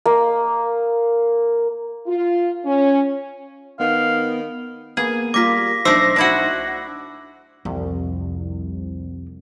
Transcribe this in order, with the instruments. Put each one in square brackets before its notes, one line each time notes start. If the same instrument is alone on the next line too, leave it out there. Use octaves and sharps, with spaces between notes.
[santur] A#3 D#6
[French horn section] F4
C#4
[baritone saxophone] D#3 [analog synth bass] B3 [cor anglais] F5
[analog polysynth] A#3 B3 [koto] G#4
[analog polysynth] G3 A#3 F4 [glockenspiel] D6 B6 [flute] A#6
[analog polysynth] B1 D#4 C5 [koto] A3 D4 [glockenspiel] D6 E6 C7
[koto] D4 E4 F#4
[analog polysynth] C2 [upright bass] F2